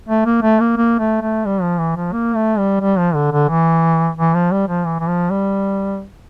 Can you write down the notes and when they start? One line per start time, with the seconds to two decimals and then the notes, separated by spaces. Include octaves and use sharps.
0.09 A3
0.25 A#3
0.42 A3
0.60 A#3
0.77 A#3
0.99 A3
1.22 A3
1.45 G3
1.62 F3
1.78 E3
1.96 F3
2.13 A#3
2.35 A3
2.58 G3
2.81 G3
2.98 F3
3.15 D3
3.31 D3
3.49 E3
4.17 E3
4.34 F3
4.52 G3
4.68 F3
4.86 E3
5.00 E3
5.08 F3
5.30 G3